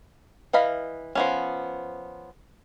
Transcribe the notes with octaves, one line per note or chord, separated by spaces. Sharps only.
E3 D#5 F5 B5
F3 B3 C#4